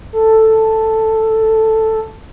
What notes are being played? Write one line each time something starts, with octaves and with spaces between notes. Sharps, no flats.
A4